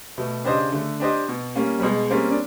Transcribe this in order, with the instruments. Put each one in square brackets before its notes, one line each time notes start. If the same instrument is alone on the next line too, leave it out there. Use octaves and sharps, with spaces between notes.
[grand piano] B2 [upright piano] A3
[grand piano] C#3 [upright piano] D4 G4 C5 D#5
[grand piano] D3 [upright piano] A3
[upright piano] D4 G4 C5 D#5
B2
G3 A#3 C#4
[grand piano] G3
[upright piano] B2 [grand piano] G#3
[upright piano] G3 A#3 C#4 [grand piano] C4
[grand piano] D4